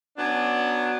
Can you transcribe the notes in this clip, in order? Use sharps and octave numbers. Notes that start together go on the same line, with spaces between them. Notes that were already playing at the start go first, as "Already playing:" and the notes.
F#3 B3 C#4 D4